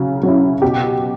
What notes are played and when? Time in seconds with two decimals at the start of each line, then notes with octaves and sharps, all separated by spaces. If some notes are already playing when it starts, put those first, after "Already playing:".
Already playing: C#3 F#3
0.23 F#3 C#4 E4
0.62 B2 G4